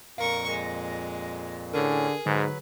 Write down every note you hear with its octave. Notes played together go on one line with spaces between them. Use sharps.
F2 A#2 A#4 F5 C#6
G#3 A#6
A2 D3 C#4 G#4 A#4
G#2 D3 F#3 B4